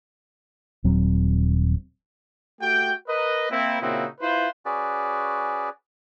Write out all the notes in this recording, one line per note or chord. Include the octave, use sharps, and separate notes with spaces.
D#1 F#3 C4
A3 F#4 G4 G5
A#4 B4 D#5
A#3 C4 E4
A#2 C#3 C4 D#4 E4 F#4
E4 F4 B4 C5
C#4 F#4 G#4 B4 D5